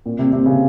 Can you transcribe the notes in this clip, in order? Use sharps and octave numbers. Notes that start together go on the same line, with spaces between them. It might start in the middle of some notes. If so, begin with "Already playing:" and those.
A#2
C3
C3
C#3